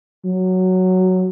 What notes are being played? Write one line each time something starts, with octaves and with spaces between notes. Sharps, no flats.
F#3